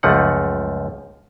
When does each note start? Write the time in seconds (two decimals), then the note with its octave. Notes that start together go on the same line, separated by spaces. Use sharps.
0.03 C#2 F#2 F3 A3 F#5